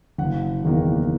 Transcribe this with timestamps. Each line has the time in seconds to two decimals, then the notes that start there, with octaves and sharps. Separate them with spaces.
0.18 F#1 F#5
0.63 E2 D#3 A#3